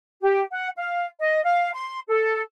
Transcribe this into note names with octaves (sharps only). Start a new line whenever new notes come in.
G4
F#5
F5
D#5
F5
C6
A4